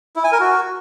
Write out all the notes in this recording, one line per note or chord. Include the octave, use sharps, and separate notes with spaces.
E4
G#5
A#4
F#4